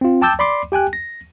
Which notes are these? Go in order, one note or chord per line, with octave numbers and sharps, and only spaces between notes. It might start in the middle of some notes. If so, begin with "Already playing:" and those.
C4 F4
G5 A5 D6 E6 G6 A6
D5 B5 C6 D6
G4 G5 G#5 F#6
A#6